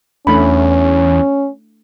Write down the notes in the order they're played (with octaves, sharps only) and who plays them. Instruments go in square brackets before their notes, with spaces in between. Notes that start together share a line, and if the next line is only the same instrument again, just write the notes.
[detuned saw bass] E2 [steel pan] A3 D4 B5 [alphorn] C#4